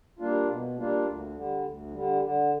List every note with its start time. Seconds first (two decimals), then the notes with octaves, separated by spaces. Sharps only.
0.19 G3 A#3 D4 F4
0.48 B2
0.77 G3 A#3 D4 F4
1.06 D2
1.34 D3 G3
1.63 D2
1.92 D3 G3
2.22 D3